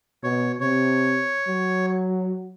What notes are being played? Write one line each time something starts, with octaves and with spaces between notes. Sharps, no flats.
B2 C#5
C3 C#5
F#3